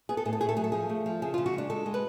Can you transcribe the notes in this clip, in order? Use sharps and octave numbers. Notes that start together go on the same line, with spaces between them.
B3 G#4
A4
A2 G#4
A4
A3 G#4
A4
F#3 G#4
A4
F3 G#4
A3
F3
C#3 G#4
F4
C#3
F#4
G#3 D4
G#3 A4
G#3
B4